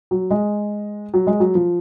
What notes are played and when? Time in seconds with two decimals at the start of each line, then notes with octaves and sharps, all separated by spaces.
0.11 F#3
0.31 G#3
1.14 F#3
1.27 G#3
1.40 F#3
1.55 F3